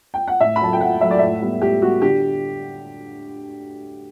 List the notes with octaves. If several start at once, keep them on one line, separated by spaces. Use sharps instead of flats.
G5
F#5
A2 E5
B5
F#3 A3 A5
G5
A2 F#5
F#3 A3 E5
D5
A2 E5
G3 B3
A2 G4
G3 B3 F#4
D3 G4